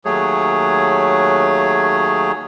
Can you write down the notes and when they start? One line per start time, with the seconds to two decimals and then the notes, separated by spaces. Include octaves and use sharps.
0.05 D#2 F#3 A3 G#4 C#5